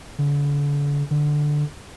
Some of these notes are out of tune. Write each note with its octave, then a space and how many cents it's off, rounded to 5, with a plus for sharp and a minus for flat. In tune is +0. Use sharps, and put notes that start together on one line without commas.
D3 -35
D3 +10